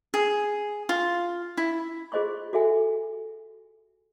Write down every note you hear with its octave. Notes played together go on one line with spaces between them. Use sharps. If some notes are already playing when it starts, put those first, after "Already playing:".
G#4
F4
E4
F4 G#4 C5 D#5 C6 C#6
F#4 A4 E5 F#5 G#5